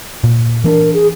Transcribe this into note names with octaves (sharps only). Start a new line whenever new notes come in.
A#2
E3 C4 D4 A#4
G#4